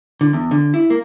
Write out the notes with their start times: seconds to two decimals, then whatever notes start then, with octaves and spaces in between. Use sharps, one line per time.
0.21 D3
0.33 E2
0.51 D3
0.74 E4
0.90 A#3